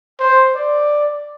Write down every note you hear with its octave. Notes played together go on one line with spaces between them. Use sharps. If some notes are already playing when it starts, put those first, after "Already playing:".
C5
D5